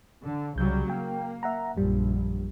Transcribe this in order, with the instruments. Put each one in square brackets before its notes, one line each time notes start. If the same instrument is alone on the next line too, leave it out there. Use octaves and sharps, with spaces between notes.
[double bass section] D3
[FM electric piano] C2 G6 [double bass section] C#3 F#3 G3
[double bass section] A#3 [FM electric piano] G5
[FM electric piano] E5 F#5 A#5
[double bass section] A#1 [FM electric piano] F#2 G3